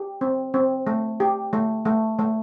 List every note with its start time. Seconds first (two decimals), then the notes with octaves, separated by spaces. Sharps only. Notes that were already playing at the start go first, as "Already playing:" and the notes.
Already playing: G4
0.21 C4
0.54 C4
0.87 A3
1.20 G4
1.53 A3
1.85 A3
2.19 A3